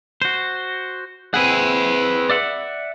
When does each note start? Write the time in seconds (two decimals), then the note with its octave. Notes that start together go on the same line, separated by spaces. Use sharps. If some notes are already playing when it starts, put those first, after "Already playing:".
0.22 F#4 C5
1.34 C4 E4 G#4 B4 F#5
2.30 D5 E5 F#5